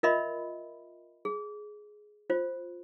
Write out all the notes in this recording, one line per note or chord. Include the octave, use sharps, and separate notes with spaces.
F4 A#4 D#5 E5 B5 C6
G#4
F4 C5